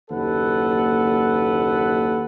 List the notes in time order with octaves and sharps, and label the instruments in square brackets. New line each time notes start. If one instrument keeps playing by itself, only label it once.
[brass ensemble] F#1 D#2 A4 B4 F#5